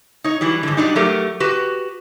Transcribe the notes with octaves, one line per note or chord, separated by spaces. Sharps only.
D#4 C#5
E3 F#3 G3
G#2 D3
F#3 G3 D4 D#4
F#3 A3 G4 A#4
F#4 G4 B4